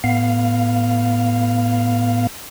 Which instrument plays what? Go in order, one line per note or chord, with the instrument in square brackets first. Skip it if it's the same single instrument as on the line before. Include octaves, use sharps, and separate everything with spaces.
[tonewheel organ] A2 B3 F5